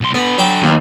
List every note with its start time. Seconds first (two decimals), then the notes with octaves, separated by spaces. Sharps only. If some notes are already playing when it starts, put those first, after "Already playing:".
0.01 B1 C6
0.14 D3 B3 B5
0.38 F#3 G5 D6
0.63 D#2